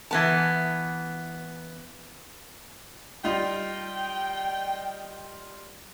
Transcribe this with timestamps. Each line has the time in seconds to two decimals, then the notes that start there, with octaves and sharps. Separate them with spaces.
0.11 E3 B3 A5
3.24 G3 D#4 F4 G5